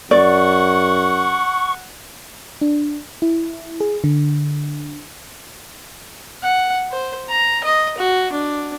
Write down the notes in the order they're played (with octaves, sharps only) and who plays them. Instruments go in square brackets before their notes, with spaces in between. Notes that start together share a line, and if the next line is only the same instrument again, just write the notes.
[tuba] F#2 [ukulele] D5 [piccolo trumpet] F#5 [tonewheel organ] C#6
[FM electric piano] D4
E4
G#4
D3
[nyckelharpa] F#5
C5
A#5
D#5
F#4
D4